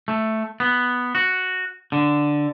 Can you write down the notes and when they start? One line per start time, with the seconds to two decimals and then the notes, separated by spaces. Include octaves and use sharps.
0.08 A3
0.60 B3
1.15 F#4
1.92 D3